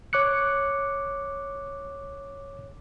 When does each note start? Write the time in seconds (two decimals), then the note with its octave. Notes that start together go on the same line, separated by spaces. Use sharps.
0.13 C#5 D6 F#6 C#7